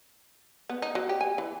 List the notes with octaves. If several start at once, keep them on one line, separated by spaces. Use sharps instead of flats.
B3
D#4
F#3
G4
G#5
E3